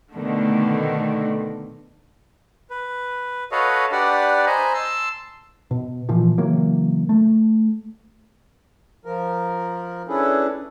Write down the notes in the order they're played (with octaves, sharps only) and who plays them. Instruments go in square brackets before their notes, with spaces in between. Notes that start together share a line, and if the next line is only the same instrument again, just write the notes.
[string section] B2 D3 D#3 A3
[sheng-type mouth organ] B4
F#4 A4 B4 C#5 D#5 F5
D4 G4 B4 D5 F#5
C5 D#5 G#5 A#5 B5
A5 C6 E6
[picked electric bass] B2
A#2 E3 F3
C#3 E3 F#3 A#3
A3
[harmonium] F3 A#4
C#4 D4 E4 G#4 A4 B4